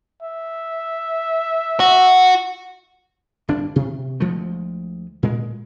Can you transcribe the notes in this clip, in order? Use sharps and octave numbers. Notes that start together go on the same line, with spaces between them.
E5
F#4
G1 D4
C3
D2 F3 G#3 A3
A#2 G#3